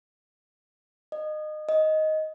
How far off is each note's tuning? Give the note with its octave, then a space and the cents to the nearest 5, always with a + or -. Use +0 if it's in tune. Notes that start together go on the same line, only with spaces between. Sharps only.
D#5 -25
D#5 +5